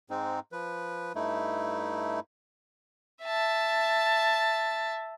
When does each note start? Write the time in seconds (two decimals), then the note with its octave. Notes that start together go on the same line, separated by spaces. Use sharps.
0.10 G#2 G#3 C4 D#4
0.52 F3 B4
1.15 G2 A3 D#4 E4
3.23 E5 A5